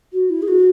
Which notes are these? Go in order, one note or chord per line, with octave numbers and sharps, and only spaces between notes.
F#4
E4
G#4
F#4